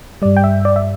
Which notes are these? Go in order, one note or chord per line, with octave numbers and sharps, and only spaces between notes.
G2 G3 D5
G5
E5
D5
E5